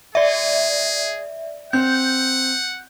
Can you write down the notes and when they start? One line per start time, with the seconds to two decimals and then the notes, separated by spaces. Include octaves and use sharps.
0.15 G#4 D5 E5
1.73 C4 F#5 G6